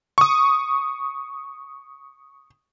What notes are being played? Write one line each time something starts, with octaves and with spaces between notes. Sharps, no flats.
C#6 D#6